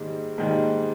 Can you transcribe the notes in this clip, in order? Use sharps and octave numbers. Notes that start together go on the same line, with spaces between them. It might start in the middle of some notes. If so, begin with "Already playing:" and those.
Already playing: G#2 D#3 G3 A#3
G#2 D#3 G3 A#3